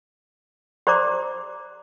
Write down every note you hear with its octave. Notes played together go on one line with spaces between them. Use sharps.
G4 C5 D5 A#5 D6